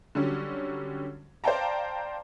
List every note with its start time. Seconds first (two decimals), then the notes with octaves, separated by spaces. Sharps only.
0.15 D3 F#3 G3 C#4
1.44 C5 D5 F5 G5 A5 A#5